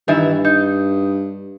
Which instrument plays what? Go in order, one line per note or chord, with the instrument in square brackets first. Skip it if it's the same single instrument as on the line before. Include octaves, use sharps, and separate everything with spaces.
[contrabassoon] G2 [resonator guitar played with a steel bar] D#3 E3 E5
[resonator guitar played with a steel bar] D#4